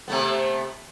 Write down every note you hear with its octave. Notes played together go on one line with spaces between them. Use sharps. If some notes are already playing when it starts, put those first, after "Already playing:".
C3 A3 B3